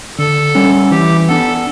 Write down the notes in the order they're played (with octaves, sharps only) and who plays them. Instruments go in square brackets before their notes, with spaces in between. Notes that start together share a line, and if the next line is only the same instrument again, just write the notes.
[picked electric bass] D3 [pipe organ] A4
[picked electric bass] G3 C#4
[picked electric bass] E3 [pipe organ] G4
[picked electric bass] B3 D4 [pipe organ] A4